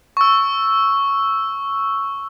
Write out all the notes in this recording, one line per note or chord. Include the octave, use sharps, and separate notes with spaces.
C#6 E6